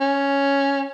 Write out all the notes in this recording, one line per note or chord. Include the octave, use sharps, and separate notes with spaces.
C#4